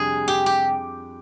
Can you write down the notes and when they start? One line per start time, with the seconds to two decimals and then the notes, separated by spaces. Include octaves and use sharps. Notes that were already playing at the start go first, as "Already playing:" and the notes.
Already playing: F2 C3 G3 D4 G#4
0.28 G4
0.46 G4